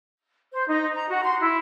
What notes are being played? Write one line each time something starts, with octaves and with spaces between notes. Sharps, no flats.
C5
D#4
A#5
F#4
C6
E4